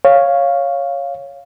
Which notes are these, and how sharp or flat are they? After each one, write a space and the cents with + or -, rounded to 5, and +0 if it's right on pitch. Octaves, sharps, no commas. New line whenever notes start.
C#5 +0 F5 +0